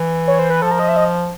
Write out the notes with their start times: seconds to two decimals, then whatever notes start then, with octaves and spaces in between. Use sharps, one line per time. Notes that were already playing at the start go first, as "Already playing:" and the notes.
Already playing: E3
0.28 C#5
0.39 C5
0.50 B4
0.62 F3 A4
0.71 A#4
0.79 D#5
0.89 E5
0.96 D#5